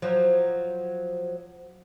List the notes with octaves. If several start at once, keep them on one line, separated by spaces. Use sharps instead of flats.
F3 F#3